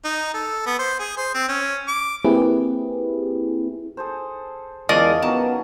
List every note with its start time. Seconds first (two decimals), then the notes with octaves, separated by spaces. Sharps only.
0.05 D#4
0.34 A4
0.66 B3
0.79 C5
0.99 G#4
1.17 C5
1.35 C4
1.48 C#4
1.88 D6
2.25 A#3 C4 E4 G4 G#4 B4
3.97 G#4 A4 C5
4.89 E2 F3 G#3 C#4 A#4 D5 D#5
5.22 D#3 F#3 B3 C#4 A5